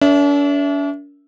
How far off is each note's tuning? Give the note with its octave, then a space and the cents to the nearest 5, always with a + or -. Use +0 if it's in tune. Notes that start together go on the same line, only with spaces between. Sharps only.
D4 -45 A#4 +0 E5 +0